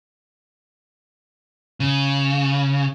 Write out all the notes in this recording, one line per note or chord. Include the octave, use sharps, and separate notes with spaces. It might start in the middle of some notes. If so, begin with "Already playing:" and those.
C#3